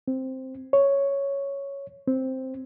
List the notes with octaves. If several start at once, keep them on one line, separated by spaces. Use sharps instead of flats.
C4
C#5
C4